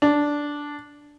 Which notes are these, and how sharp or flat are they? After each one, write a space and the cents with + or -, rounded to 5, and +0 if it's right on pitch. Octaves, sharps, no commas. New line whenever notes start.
D4 -5